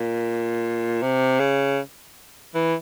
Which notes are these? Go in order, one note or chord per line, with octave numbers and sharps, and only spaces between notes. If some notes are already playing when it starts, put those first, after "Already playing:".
Already playing: A#2
C3
C#3
E3